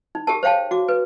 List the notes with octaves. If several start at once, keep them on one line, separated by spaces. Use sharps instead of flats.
D#4
G4 G#4 A#4 A5
C5 C#5 F5 G5 A5
F#4 D6
B4